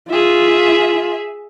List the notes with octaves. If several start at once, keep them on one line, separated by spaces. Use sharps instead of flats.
F4 G#4 E5